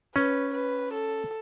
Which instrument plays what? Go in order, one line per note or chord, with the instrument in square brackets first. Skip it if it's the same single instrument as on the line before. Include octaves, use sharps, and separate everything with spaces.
[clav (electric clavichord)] C#4 [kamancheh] B4
[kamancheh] B4
A4